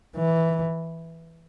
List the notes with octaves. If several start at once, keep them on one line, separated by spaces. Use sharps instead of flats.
E3